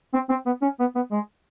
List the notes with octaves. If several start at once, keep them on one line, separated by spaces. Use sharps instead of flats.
C4
C4
B3
C#4
B3
B3
G#3